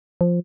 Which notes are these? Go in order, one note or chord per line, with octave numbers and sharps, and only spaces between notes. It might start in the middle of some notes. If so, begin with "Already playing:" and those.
F3